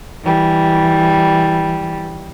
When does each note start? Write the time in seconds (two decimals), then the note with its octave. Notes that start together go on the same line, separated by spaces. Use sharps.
0.24 E3 G3